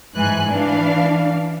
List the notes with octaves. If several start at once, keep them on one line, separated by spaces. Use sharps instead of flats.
G#2 E3 G#5 F#6
E3 D4 F5